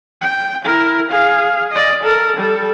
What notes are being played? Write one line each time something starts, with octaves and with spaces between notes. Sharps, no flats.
G5
E4 A#4
G#4 F5
D5 D#5
A4 A#4
G3 A4